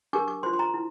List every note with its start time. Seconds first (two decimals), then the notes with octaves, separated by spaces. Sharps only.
0.13 D4 G4 A#4 D6
0.28 D6
0.43 F4 C5 C6
0.53 C6
0.59 A#5
0.74 E4